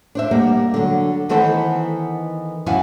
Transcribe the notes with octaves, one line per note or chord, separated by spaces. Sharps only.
D4 C5 E5
G3 A#3 F#5
D3 F#3
D#3 E3 B3 A4 C5 F#5
F#2 E4 F5 F#5 G#5